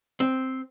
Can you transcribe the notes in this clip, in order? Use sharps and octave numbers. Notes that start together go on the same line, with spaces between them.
C4